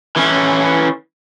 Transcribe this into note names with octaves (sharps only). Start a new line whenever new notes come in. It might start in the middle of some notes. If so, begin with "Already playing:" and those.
E3 C#4